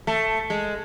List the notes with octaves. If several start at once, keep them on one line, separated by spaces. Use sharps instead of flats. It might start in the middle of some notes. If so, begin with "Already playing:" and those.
A3
G#3